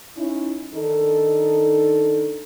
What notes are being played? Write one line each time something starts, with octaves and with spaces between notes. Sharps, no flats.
C#4 D#4 E4
D#3 D4 D#4 A4